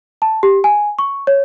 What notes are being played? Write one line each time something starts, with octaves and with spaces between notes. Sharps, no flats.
A5
G4
G#5
C#6
C#5